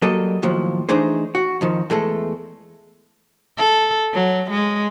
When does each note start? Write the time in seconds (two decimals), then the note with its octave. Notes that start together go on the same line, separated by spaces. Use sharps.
0.02 F#3 G3 A#3 A4 D#5
0.43 D#2 A2 F3 F#3
0.89 E3 A3 D4 D#4 G#4 C5
1.35 F#4
1.61 F2 D#3 F3
1.90 E2 G#3 A3 A4
3.57 A4
4.14 F#3
4.50 G#3